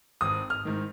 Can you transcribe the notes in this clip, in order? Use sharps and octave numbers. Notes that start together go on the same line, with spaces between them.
G#1 D#6
F6
G#2 D#3